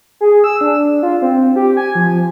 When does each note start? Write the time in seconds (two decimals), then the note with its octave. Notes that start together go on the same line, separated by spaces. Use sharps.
0.21 G#4
0.44 E6
0.61 D4
1.03 F4
1.22 C4
1.56 G4
1.77 G#5
1.95 F3